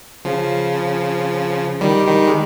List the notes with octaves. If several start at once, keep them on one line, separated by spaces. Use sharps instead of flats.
C#3 F3
D#3 G3
D#3 G3
G#3